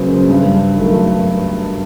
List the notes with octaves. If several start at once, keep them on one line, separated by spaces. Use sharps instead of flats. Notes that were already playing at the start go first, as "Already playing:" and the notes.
Already playing: C#2 C#3 F#3 A#3 B4 C5
G2
D#3 F#3 A3